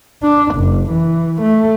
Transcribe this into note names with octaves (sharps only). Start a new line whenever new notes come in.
D4
F#1
E3
A3